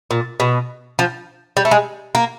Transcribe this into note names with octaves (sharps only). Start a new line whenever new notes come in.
A#2
B2
F3
G3
A3
G#3
A#3